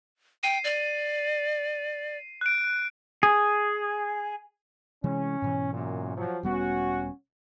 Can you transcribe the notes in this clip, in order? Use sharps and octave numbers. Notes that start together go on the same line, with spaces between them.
G5 C7 D#7
D5
F#6 D7
G#4
C3 E3 G#3 C#4
G#2 B2 E3
F#2 A#2
F3 F#3
E1 G3 B3 C#4 F#4